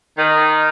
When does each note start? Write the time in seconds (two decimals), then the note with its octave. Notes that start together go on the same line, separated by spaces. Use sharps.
0.17 D#3